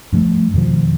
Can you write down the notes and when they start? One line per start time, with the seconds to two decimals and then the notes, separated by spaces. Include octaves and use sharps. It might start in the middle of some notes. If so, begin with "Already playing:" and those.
0.12 G2 F3 F#3 A3
0.54 F2 B2 D#3 F3